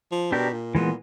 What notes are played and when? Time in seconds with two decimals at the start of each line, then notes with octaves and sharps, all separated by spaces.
0.11 F3
0.32 B2 D4 G4 A#4
0.53 A#2
0.75 A#2 E3 G#3 B3